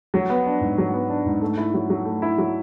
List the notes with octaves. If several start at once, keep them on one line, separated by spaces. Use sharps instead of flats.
F#3
B3
D4
G#2
F#3
B3
D4
G#2
A3
E4
F#3
F#3
A3
E4
F#3